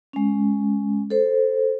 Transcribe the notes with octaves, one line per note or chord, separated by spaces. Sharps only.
G#3 C#4
A4 C5